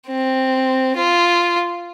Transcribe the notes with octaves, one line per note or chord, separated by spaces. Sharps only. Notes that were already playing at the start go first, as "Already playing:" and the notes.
C4
F4